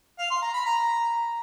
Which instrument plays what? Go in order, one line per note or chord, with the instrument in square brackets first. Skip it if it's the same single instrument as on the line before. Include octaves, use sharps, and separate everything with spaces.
[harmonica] F5
C6
A#5
B5
A#5